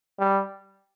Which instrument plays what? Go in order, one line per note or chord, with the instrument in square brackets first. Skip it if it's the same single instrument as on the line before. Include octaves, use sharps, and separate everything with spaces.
[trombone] G3